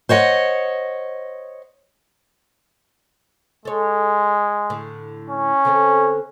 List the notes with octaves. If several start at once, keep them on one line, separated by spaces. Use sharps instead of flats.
C5 C#5 D#5 F#5
G#3 A4 C#5
A2 D3
C#4
D3 C4 A4